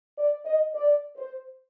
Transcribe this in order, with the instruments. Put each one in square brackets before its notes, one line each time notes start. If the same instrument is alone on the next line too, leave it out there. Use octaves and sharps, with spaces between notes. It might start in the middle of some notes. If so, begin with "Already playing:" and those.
[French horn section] D5
D#5
D5
C5